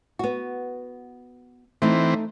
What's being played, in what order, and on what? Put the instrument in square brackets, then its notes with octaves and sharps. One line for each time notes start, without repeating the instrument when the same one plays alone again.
[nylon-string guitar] B3 F#4
[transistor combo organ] E3 C4 [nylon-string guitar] A3 D#4